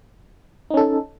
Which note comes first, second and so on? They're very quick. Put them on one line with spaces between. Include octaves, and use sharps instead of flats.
D#4 C#4 A4